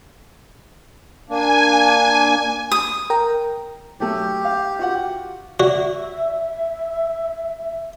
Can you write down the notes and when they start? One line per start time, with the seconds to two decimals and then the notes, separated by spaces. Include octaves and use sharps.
1.30 A#3 D4 G#5
2.72 D#6
3.10 A#4 G5 A#5
4.00 F#3 A3 G4
4.45 F5
4.79 F4 F#4 F#5
5.60 F#4 D5 E5